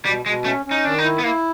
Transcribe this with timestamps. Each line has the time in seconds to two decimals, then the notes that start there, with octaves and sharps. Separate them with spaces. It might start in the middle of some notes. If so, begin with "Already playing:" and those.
0.05 B2 G3
0.25 B2 G#3
0.45 A3 C#4
0.65 C#4
0.71 D#4
0.85 D#3 D4
0.99 D#4
1.04 E4
1.19 B3
1.23 A#3 E4